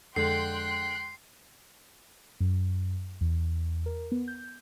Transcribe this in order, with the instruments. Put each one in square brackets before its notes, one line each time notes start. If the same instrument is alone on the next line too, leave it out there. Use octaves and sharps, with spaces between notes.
[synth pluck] F2 G#3 [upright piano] D3 [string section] G5 C6 F#6 [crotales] C7
[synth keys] F#2
E2
A#4
B3
G6